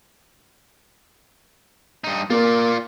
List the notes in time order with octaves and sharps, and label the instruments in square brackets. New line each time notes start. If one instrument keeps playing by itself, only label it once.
[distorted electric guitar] G2 D#4
[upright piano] A#3 [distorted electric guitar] F4 D5